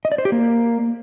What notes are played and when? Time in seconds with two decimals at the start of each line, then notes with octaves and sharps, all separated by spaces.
0.05 D#5
0.12 D5
0.18 C5
0.25 G4
0.32 A#3